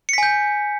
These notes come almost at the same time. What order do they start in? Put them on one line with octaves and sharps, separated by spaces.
C#7 B6 G#5 G6